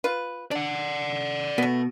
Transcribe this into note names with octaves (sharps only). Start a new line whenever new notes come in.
F4 B4
D4 D5 F#5
B2 A3 B3